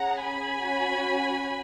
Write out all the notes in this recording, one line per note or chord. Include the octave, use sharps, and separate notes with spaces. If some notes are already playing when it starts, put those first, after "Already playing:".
Already playing: C#4 G#4 F#5 A#5
G#5 B5
C#4 F#4